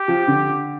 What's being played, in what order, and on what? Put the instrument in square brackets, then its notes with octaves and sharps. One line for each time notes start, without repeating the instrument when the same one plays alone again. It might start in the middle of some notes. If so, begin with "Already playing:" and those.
Already playing: [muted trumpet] G4
[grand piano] F3
D3